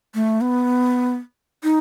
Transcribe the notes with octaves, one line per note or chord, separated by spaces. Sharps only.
A3
B3
D#4